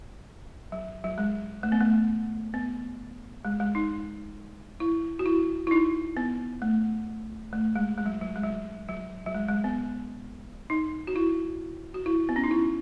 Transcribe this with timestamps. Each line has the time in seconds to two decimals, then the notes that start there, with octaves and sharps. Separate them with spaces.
0.72 F#3
1.04 F#3
1.18 G#3
1.63 A3
1.72 B3
1.81 A3
2.54 B3
3.45 G#3
3.60 G#3
3.75 D#4
4.80 E4
5.19 F#4
5.26 E4
5.67 E4
5.71 D#4
6.17 B3
6.62 A3
7.53 A3
7.76 G#3
7.98 G#3
8.06 F#3
8.21 F#3
8.36 G#3
8.43 F#3
8.88 F#3
9.26 F#3
9.34 G#3
9.48 G#3
9.64 B3
10.70 D#4
11.07 F#4
11.16 E4
11.94 F#4
12.06 E4
12.29 B3
12.36 C#4
12.44 D#4
12.51 E4